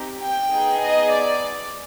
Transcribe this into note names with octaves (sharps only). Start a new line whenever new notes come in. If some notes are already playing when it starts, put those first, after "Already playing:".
Already playing: C4 D#4 G4
G5
B3 D#4 G#4
D#5
D5